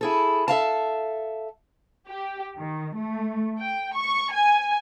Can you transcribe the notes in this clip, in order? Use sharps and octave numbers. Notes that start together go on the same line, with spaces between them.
E4 G#4 A4
A4 E5 F5 A5
G4
D#3
A3
G5
C#6
G#5